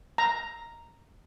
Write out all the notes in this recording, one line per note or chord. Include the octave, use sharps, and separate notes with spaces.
A#5